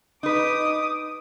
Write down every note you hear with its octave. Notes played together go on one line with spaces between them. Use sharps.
D#4 B4 D6 D#6